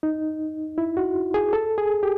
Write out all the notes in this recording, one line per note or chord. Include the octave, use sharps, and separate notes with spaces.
D#4
E4
F#4
G#4
A4
G#4
G4